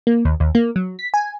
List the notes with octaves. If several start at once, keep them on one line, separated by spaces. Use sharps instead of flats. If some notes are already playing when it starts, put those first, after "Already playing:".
A#3
D#2
D#2
A#3
F#3
B6
G#5